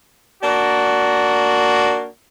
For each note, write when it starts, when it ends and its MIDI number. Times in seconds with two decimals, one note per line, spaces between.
0.43 2.08 58
0.43 2.08 62
0.43 2.08 66